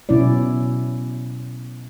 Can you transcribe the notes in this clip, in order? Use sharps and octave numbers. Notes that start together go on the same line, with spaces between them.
B2 F#3 C#4 E4 D5